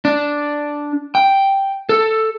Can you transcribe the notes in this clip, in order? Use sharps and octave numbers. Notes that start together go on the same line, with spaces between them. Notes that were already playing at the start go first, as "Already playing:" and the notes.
D4
G5
A4